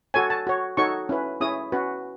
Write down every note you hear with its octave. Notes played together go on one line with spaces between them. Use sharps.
F#4 A4 C#5 G#5
A5
F#4 C#5
D#4 F#4 A4 C#5 C#6
C#4 E4 B4
C#4 E4 G#4 C#5 D#6
C#4 F#4 B4